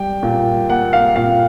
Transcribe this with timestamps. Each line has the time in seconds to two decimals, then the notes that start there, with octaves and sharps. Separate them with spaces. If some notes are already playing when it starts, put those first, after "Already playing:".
Already playing: G3 G5
0.23 A#2
0.69 A#3 F#5
0.93 F5
1.16 A#2 F5